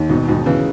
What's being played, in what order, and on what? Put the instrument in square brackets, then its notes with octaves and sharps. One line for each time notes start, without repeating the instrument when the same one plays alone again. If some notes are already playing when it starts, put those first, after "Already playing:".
Already playing: [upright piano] D#2
[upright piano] E1 [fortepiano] G#2 B2
[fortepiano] G#2 B2
[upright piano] D#3
[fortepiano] C#3 E3